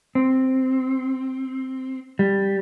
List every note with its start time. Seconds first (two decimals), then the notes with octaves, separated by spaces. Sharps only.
0.15 C4
2.19 G3